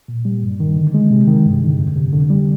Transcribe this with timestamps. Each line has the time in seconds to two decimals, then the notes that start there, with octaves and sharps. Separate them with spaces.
0.08 A#2
0.25 G3
0.43 G2
0.60 D#3
0.76 D3
0.94 G#3
1.11 C3
1.27 D#3
1.45 G2
1.62 D3
1.79 F2
1.96 C3
2.13 D3
2.30 G3